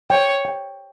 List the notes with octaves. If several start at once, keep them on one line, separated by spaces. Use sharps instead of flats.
C#5 G5
G5